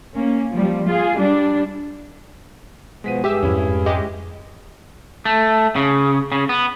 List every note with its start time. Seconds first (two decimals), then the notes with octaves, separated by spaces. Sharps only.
0.16 A#3 C#4
0.53 F3 G3
0.88 F4 G#4
1.18 G3 D4
3.04 B2 F3 G#3 B3 B6 D#7
3.24 G2 G4 G#4 E5 E6
3.43 F2 G#2 F3 C#4 E4
3.86 G#3 G4 D#5
5.25 A3
5.76 C#3
6.32 C#3
6.49 B3